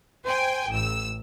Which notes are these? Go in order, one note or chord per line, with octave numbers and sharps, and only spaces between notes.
C5 G5 G#5
A1 E6